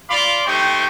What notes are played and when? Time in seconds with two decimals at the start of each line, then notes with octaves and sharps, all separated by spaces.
0.10 F4 D5 F5 B5 C6 D6
0.46 A3 D#4 G4 C5 G5 C#6